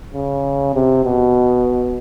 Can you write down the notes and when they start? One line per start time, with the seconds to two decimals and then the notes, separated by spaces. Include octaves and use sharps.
0.14 C#3
0.74 C3
1.05 B2